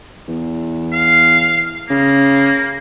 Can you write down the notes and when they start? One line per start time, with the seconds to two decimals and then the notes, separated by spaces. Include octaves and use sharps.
0.28 E2
0.94 F5
1.90 C#3 A#3